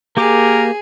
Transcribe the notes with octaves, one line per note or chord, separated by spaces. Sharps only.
A#3 G4 G#4 A#4 D6